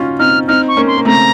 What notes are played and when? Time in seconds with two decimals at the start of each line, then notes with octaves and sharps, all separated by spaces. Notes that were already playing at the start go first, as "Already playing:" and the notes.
Already playing: C#4 D#4 F4 F#4
0.19 C4 D#4 F6
0.48 C4 D#4 F6
0.68 C#6
0.77 A#3 C#4
0.87 C6
0.98 A#3
1.05 A3 C4 A#5